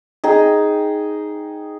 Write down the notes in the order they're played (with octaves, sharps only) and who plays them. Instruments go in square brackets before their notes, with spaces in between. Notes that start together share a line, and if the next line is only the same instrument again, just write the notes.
[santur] D#4 G#4 G5